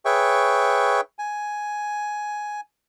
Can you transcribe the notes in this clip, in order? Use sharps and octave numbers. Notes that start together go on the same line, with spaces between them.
G#4 B4 C#5 E5 G5 C#6
G#5